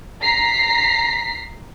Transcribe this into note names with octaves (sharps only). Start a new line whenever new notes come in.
A#5 B6 C7